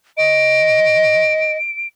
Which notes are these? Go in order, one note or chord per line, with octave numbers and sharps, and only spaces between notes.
D#5 D7